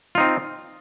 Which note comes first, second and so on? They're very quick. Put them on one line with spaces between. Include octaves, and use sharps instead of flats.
F4 D#4 C4